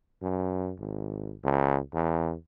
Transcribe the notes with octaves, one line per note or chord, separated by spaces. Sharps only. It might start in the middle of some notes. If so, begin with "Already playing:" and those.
F#2
G#1
C#2
E2